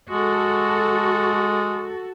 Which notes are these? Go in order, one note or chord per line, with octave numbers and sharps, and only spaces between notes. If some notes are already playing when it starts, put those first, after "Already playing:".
G#3 F#4 A4